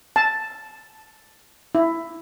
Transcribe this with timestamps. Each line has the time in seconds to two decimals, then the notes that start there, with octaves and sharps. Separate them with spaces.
0.16 A5
1.75 E4